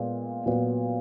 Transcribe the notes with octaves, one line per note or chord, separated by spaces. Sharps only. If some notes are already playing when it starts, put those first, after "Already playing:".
Already playing: A#2 G#3 B3
A#2 F#3 B3